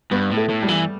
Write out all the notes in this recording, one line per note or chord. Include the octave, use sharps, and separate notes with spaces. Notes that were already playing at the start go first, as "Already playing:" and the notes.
G2 B3
A2
A3
A2
G3
E3